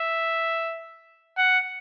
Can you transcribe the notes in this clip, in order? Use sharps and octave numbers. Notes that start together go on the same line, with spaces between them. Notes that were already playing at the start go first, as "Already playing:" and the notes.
Already playing: E5
F#5